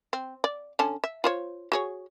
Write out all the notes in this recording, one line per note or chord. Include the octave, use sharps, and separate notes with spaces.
C4
D5
D3 C#4 A5
E5
F4 C5 C#5
F#4 G#4 C#5